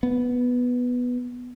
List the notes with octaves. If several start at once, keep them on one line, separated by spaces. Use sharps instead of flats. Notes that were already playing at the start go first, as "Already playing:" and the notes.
B3